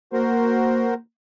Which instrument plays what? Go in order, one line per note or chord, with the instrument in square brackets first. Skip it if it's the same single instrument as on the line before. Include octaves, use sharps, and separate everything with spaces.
[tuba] A#3 [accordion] F#4 A#4 C5